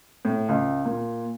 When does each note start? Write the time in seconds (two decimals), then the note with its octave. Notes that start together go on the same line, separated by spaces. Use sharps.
0.25 A2
0.49 C#2
0.86 A#2